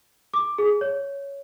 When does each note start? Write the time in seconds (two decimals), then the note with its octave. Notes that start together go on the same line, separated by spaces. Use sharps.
0.34 D6
0.58 G#4
0.81 C#5